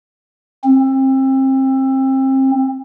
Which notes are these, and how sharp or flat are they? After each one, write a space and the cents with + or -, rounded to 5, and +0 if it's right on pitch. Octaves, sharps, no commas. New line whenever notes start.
C4 +30